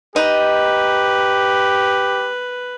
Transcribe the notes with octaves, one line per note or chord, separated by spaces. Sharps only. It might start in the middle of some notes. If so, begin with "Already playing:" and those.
D#4 G4 B4